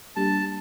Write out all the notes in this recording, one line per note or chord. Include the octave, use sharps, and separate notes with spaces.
G3 A#3 D4 G4 A5